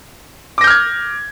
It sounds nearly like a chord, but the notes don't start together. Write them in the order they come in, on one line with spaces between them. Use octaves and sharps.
D6 A#6 G6 F6 G#6